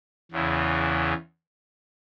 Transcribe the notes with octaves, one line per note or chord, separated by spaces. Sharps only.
E2 C#3 E3